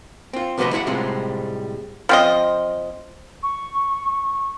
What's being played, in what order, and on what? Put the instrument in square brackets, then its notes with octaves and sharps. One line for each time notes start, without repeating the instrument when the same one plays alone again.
[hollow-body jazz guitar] C4 F4
D2 C3 F3 F#4 B4 D#5
E4 F#4 E5 F#5
A2 C3 G3 G#3 C4 F4
[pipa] F3 C4 D#5
[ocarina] C#6